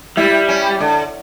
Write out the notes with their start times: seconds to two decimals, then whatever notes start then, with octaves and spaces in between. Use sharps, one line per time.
0.17 G3 E4
0.49 C#4
0.80 D3